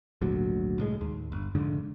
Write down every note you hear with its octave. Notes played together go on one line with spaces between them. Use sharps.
G#1 D2 A#2 F#3
C2 A2 G#3
D#2
G1
F1 G#2 D3